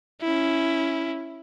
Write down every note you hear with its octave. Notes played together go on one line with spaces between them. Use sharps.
C#4 E4